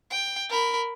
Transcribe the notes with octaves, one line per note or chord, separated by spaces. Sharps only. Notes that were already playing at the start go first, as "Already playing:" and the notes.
G5
A#4 B5